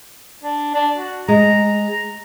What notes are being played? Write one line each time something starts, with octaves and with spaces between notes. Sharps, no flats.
D4
D4
F#4
G#3 A#5